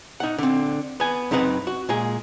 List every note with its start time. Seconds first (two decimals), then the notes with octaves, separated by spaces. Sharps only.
0.20 D#4 F#5
0.38 D3 C4
1.00 B3 G#5
1.31 F#2 C4 D#4 B4 F#5
1.67 F#4
1.89 A#2 G#3 G#4